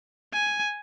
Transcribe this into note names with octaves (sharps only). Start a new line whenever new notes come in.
G#5